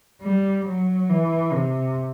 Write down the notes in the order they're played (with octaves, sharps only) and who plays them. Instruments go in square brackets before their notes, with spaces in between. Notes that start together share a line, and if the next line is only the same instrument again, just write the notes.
[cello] G3
F#3
E3
C3